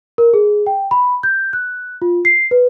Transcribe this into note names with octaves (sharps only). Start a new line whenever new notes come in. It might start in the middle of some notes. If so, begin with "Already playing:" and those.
A#4
G#4
G5
B5
G6
F#6
F4
C7
B4